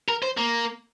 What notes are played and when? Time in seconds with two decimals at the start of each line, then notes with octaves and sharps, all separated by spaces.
0.08 A#4
0.22 C5
0.37 A#3